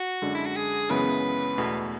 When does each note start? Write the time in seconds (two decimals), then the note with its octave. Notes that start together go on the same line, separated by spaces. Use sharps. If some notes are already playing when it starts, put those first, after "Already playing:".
Already playing: F#4
0.22 F#2 D3 G#3 D4
0.34 E4
0.45 F#4
0.56 G#4
0.90 F#2 C#3 E3 G#3 B3 B4
1.58 E2 B2 A3